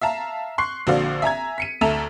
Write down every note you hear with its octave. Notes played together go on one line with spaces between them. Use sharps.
E5 F5 A5 A#5
C6 C#6 F#6 C7
A#1 D3 F#4 C5 D5 F5
E5 G#5 A#5 G#6
B6 C#7 D#7
D2 A4 E5 A5 A#5 F7